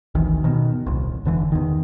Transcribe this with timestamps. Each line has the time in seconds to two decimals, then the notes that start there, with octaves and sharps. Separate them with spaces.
0.15 G#1 D2 D#3 E3
0.44 B2 D#3
0.86 D#1 C2
1.25 F1 D3 E3
1.52 E2 D#3